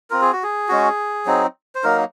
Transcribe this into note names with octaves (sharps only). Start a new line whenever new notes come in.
C4 F4 A#4
G#4
F#4
G#4
G#3 C#4 F#4
F#3 C4 D#4
C5
F#3 A#3 D#4 A#4